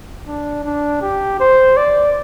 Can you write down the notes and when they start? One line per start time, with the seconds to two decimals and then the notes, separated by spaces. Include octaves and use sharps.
0.27 D4
0.64 D4
1.02 G4
1.40 C5
1.77 D5